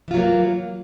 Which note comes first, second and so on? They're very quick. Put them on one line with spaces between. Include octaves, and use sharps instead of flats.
E3 F4 F#3 A#3